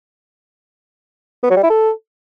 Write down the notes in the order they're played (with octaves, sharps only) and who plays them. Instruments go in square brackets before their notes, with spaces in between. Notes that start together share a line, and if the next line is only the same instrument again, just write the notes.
[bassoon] B3
F#3
G3
E4
A4